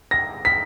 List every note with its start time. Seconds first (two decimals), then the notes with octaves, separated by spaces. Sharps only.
0.11 A#6
0.45 B6